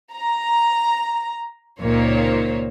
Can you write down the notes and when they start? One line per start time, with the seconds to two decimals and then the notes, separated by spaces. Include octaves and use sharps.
0.12 A#5
1.81 C#2 A#2 D#3 A#3 C5 C#5